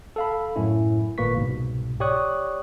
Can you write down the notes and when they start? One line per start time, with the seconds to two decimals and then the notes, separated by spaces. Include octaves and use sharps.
0.16 A4 F5 B5
0.56 F#2 A2 C#4 E4
1.18 G#1 A#2 A#3 B4 C#6 B6
1.36 C2 G#2 B2
2.00 G4 C#5 D5 C#6 D#6 F#6